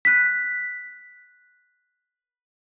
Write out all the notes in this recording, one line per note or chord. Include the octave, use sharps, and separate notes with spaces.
F#6 B6